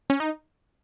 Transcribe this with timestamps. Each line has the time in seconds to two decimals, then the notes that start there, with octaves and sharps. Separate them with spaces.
0.10 C#4
0.20 D#4